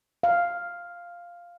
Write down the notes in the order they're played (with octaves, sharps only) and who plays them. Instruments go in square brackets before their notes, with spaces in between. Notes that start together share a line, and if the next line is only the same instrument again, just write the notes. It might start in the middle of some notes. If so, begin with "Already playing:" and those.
[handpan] F5